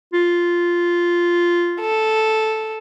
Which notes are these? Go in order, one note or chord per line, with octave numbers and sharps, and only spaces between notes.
F4
A4